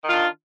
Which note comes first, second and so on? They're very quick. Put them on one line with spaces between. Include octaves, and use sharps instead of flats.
D#3 F4 D4